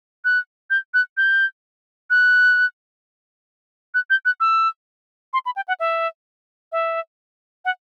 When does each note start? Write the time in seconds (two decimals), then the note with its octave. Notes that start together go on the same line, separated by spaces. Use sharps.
0.25 F#6
0.70 G6
0.94 F#6
1.17 G6
2.10 F#6
3.94 F#6
4.10 G6
4.25 F#6
4.40 E6
5.33 C6
5.46 B5
5.56 G5
5.68 F#5
5.80 E5
6.72 E5
7.65 F#5